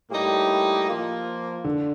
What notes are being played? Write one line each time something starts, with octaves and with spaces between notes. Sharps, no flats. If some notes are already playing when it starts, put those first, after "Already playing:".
A2 G3 A#3 D#4 G4
F3 A#3 F4
D3